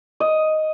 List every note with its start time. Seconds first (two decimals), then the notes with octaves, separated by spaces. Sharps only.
0.20 D#5